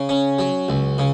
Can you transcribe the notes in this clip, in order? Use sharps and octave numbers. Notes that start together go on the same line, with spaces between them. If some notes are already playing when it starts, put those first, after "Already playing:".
Already playing: C#3
C#4
F#3
C#2
C#3